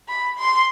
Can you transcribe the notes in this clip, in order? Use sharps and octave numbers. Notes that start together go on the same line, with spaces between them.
B5
C6